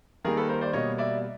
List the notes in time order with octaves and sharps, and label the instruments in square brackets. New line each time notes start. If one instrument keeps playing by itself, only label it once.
[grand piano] D#3 G3 A#3 G#4 A#4
A4 B4
A#4 C5
C5 D5
B2 G3 A#3 C#5 D#5
D5 E5